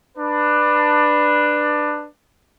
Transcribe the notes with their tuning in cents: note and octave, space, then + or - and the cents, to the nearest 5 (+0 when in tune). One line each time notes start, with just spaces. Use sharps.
D4 +15 B4 +0